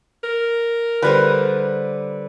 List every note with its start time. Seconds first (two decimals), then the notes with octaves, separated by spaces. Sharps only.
0.24 A#4
1.02 D3 G3 B4 C5